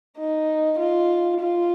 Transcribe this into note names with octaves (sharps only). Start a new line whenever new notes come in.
D#4
F4
F4